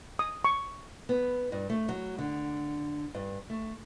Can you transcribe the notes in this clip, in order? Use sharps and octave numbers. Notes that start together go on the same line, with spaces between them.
D#6
C#6
B3
G2
A3
F#3
D3
G2
A3